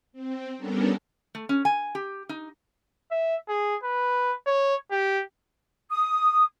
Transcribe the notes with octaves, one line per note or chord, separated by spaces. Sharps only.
C4
G3 B3 C#4 D4 A4 A#4
A3
C#4
G#5
G4
D#4
E5
G#4
B4
C#5
G4
D#6